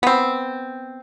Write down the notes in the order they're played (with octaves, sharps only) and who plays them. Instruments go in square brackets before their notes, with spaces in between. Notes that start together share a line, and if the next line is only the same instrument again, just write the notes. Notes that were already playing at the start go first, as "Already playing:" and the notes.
[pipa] B3 C4